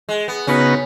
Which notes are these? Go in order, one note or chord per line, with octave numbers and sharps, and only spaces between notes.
G#3
B3
C#3 B3 C#4 D#4 F#4 B4